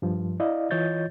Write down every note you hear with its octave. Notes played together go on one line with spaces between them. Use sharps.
G2 F3
E4 D5 D#5 F5
E3 F4 C#5 D#5 G6 A6